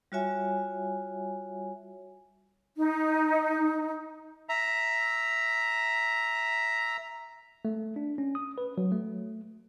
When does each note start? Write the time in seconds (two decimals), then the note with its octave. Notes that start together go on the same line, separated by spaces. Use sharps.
0.12 G3 F4 F#4 C#5 E5 G#5
2.76 D#4
4.49 E5 A#5
7.65 A3
7.96 D4
8.18 C#4
8.35 D#6
8.58 B4
8.78 F#3
8.92 A3